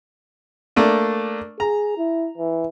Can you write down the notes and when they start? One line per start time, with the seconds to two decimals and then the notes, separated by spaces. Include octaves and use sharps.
0.76 A3 A#3 D4
1.60 G#4 A#5
1.98 E4
2.38 E3